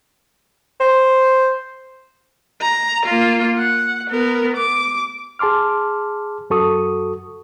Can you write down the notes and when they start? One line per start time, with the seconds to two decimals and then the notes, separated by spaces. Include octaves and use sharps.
0.80 C5
2.62 A#5
3.06 A#3 F4
3.58 F#5
4.10 B3 A#4
4.57 D6
5.39 G#4 A5 C6 D6 F6
6.50 F#2 F#4 A4 C#6 D#6